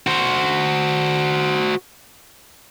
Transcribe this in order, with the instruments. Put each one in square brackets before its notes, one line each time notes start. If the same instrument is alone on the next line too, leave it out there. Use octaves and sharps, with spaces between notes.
[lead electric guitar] F#4 C5